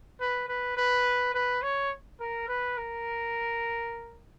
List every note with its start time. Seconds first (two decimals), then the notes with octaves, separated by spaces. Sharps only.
0.20 B4
0.48 B4
0.77 B4
1.34 B4
1.62 C#5
2.20 A#4
2.48 B4
2.77 A#4